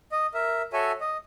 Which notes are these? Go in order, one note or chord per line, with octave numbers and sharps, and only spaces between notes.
D#5
A#4 E5
F#4 A4 C#5 E5 G#5
D#5